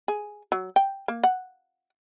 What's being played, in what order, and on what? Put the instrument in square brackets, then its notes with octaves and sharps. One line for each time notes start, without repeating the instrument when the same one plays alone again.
[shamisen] G#4
F#3
G5
A#3
F#5